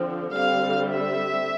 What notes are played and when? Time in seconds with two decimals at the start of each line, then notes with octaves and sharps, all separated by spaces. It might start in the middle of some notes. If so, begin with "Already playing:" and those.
Already playing: D3 F3 C4
0.33 D3 G3 C4 F5
0.89 E5